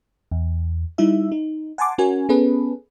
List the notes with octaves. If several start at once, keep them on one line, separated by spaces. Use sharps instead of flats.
E2
G3 D#4 E4 E5
D#4
F#5 G#5 A5 C6 D6
C#4 F#4 A#4 G#5
B3 C#4 G#4 A4 B4